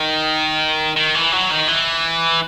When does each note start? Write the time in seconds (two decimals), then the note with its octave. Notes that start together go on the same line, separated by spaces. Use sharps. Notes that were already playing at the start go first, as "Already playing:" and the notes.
Already playing: D#3
0.96 D#3
1.15 E3
1.32 F#3
1.50 D#3
1.68 E3